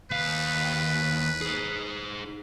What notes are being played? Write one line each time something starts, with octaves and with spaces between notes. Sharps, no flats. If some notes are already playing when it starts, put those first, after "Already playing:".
D#2 B4 F5
D#4 G#4